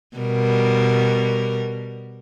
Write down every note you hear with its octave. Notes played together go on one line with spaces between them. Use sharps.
B2 G3 A#4